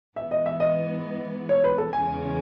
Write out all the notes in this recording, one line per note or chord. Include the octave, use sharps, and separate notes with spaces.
G#2 E3 B3 E5
D#5
E5
D#5
C#5
B4
A4
E2 C#3 G#3 C#4 G#5